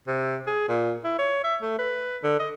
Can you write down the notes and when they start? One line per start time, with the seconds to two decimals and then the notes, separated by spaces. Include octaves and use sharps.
0.07 C3
0.47 G#4
0.68 A#2
1.04 E4
1.19 C#5
1.44 E5
1.62 A3
1.79 B4
2.23 D3
2.40 D#5